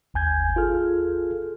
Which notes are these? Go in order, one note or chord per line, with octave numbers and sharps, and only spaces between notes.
G1 D#2 G#5 G6 G#6
F4 G#4 A4 F6